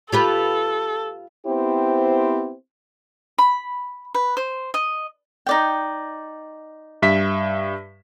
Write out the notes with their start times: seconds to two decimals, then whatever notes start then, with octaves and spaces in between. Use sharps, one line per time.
0.12 F4 G4 A4 B4
1.47 B3 C4 E4 G4 C5
3.38 B5
4.14 B4
4.37 C5
4.74 D#5
5.46 D#4 D5 G5
7.02 G2 E5 B6